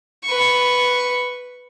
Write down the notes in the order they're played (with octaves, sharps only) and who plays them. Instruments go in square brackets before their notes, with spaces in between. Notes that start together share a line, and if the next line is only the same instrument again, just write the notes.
[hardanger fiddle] B4 C#6